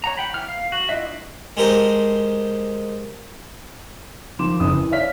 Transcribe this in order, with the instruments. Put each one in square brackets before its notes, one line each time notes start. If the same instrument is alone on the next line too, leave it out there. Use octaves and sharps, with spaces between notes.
[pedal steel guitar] C#5 F#5 A#5
F#5 G5 B5
E3 F6
F5
F#4
D4 E4 F4 D#5 E5
[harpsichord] G#3 G4 A#4 C5
[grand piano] D#2 F3 C6 D6 E7
F#1 D#6
E3
C#5 D5 E5 F5 F6 B6